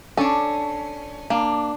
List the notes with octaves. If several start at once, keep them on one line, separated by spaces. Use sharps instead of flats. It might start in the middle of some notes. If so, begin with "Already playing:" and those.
C#4 D4 A4
A#3 D4